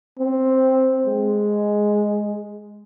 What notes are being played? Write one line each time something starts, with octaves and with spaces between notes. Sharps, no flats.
C4
G#3